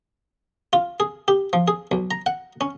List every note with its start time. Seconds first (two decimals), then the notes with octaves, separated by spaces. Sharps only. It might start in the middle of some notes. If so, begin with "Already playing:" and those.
0.73 F4
1.00 G#4
1.28 G4
1.53 F3
1.68 G#4
1.91 B1
2.11 A#5
2.26 F#5
2.61 C#4